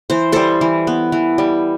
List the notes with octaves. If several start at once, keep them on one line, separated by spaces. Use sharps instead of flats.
E3 C5
G3 A4 C5
E3
B3
E3
G3